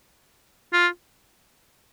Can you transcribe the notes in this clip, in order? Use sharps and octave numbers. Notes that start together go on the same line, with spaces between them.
F4